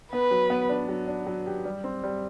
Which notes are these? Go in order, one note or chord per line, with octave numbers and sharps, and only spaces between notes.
B3 B4
F#3
B3
D4
F#3
D4
F#3
G4
G3
C4
G3